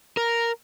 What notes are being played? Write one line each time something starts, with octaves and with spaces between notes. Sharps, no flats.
A#4